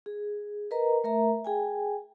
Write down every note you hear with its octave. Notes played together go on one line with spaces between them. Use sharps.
G#4
A#4 B4 D#5 A#5
A3 A#4 E5 A#5
G#4 G5 G#5